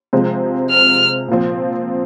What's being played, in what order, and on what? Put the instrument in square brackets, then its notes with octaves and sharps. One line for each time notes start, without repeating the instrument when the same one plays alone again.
[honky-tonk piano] C3 F3 G#3 C4
[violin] F6
[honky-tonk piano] A#2 F3 C4